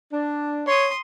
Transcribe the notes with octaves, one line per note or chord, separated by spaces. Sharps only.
D4
C#5 C6 D#6